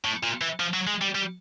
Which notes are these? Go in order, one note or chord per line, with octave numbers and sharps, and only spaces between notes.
A2
A#2
E3
F3
F#3
G#3
G3
G3